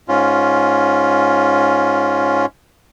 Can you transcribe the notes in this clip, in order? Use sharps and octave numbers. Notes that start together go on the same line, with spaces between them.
G#2 C#4 F4